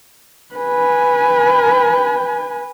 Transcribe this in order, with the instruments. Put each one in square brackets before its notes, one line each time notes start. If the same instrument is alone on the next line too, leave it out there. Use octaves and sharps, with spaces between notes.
[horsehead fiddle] B4 G#5